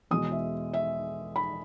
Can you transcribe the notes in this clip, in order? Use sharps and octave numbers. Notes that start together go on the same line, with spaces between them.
E2 B2 G#3 D#6
E5
E5
B5